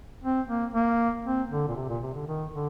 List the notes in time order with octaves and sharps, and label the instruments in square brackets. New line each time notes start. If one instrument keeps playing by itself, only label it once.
[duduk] C4
A#3
A#3
C4
D3
A#2
C3
A#2
C3
D3
D#3
D3